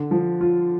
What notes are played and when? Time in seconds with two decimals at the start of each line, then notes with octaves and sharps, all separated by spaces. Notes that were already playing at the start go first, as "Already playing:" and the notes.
Already playing: D3
0.11 F3
0.41 F4